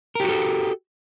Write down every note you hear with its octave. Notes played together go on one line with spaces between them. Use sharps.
F#4 G4 A4 A#4